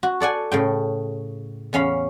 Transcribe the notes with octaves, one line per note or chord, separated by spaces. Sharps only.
F#4
A4 D5 F#5 G#5
A2 C#3 G5
E2 C#4 F5 B5